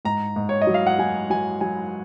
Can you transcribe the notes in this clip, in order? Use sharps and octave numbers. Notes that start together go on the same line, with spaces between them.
G#2 A#5
G#2
C#5
D#5
F#3
F5
F#5
F#3 G#5
F#3 G#5
F#3 G#5